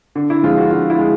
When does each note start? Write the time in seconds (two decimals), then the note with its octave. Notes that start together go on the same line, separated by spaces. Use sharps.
0.15 D3
0.30 E4
0.43 F3 G#3 F4
0.58 F#4
0.71 D3 F4
0.90 E4
0.98 G#3